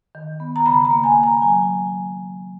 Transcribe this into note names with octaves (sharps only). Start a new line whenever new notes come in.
D#3
B3
A#5
C#3 B5
A#5
A#3
G#5
C#3
A#5
F#3 G#5